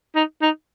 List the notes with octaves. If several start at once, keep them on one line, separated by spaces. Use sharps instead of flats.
D#4
D#4